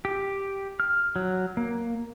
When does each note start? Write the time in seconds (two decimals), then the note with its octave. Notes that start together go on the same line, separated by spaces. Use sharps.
0.05 G4
0.80 F6
1.16 F#3
1.57 A#3